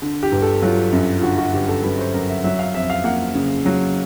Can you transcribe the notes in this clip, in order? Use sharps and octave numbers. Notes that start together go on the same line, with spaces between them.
D3
G4
G1
A4
F#3 F4
F#2
F4
D3 F#4
F#4
G1 G4
A4
F#3 B4
C5
F#2 A#4
E5
F#3 E5
F5
F2 E5
F5
A#3 F#5
C#3
F#3